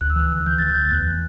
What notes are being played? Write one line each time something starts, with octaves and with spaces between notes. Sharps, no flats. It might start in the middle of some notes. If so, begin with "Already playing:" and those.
D2 F#6
E6
E3 F#6
D2
E3 G6
D2 A6
G6
D2
E2 F#6
E3